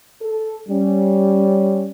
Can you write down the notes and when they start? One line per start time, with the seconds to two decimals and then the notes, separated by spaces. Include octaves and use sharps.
0.22 A4
0.69 G3 C#4